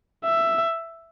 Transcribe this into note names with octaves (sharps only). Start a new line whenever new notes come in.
E5